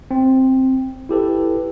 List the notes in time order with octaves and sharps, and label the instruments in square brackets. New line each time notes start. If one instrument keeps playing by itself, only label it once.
[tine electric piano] C4
E4 G4 A4 B4